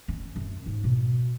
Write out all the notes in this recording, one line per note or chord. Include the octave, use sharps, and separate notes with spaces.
C#4
F#2
G#2
B2